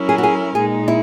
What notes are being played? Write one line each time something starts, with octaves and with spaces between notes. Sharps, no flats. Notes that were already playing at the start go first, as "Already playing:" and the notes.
Already playing: F#3 C#4 E4 A#4
G#4
F#4
G#4
A#2 G#3 D#4 G#4
E4